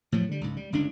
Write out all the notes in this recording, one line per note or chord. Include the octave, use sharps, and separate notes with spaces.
A2 F3 F#3
D3 G3
C#2 G#2
G3
G1 C#2 D4